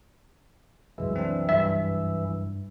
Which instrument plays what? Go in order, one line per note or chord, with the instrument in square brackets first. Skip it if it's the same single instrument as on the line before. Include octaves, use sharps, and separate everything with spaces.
[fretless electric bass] C2 F#2 [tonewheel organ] E3 [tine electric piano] G#3
[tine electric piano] C4 D4
[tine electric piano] G2 [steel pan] E5